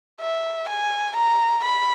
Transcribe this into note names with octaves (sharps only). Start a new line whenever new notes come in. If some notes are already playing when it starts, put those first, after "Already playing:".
E5
G#5
A#5
B5